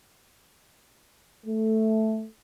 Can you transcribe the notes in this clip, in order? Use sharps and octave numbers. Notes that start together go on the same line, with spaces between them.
A3